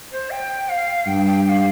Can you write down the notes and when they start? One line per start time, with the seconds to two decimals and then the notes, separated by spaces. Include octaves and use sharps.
0.12 C5
0.31 G5
0.69 F5
1.07 G2 G5
1.26 G5
1.46 G5
1.49 F5